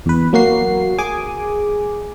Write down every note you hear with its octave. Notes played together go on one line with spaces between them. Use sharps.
E2 B4
F#3 A#3 F#4 C7
G#4 G#5 D6